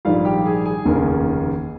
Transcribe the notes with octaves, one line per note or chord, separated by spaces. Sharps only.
A#1 G#2 D#3 G3 F4 F5
G4 G5
G#4 G#5
G#4 G#5
F1 D#2 C#3 F3 A#3